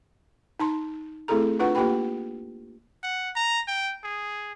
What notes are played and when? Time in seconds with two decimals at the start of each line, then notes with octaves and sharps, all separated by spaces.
0.60 D#4 A5 C6
1.28 A3 C4 E4 G#4 A4 A#5
1.59 D4 F4 B4 F#5 C#6
1.75 A#3 F4 G4 B4 G5 B5
3.03 F#5
3.36 A#5
3.68 G5
4.04 G#4